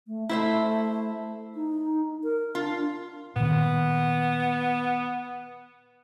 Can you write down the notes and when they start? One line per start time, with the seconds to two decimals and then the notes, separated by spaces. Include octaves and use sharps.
0.07 A3
0.29 A3 E4 C5 E5
1.55 D#4
2.24 A#4
2.55 D4 F4
3.36 A#2 D#3 B3